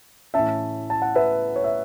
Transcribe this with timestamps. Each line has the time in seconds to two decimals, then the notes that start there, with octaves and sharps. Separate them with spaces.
0.34 A2 E3 C#4 E5 A5
0.90 A5
1.02 F#5
1.15 B4 E5
1.56 C#5
1.64 E5